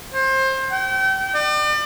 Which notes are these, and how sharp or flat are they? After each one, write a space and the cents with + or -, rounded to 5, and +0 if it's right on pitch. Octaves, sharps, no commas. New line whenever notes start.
C5 +25
G5 -35
D5 +35